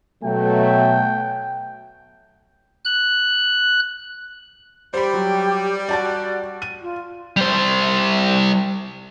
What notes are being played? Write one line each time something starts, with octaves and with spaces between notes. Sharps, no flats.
B2 F#3 A3 G5
F#6
G3 G4 C5 B5
F#3
F#4 D5 A5 A6
D#7
F4
G3 C5